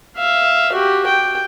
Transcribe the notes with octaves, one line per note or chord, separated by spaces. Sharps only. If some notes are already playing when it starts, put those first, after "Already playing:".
E5 F5
F#4 G4
G5